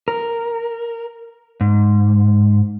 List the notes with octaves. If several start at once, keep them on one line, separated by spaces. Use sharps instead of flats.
A#4
G#2